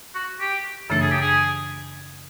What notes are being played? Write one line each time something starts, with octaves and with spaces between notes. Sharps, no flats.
F#4
G4
F#2 C#3 E3 A3 D4 A4
G#4
G4
G#4